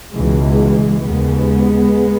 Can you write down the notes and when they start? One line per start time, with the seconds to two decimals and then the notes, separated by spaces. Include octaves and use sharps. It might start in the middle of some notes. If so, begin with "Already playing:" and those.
0.16 C#2 B2 E3 G#3
1.06 D#2 C#3 G#3 B3